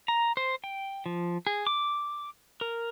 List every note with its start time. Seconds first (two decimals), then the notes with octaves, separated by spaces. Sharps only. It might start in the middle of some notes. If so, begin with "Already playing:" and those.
0.08 A#5
0.37 C5
0.64 G5
1.06 F3
1.47 G#4
1.67 D6
2.61 A#4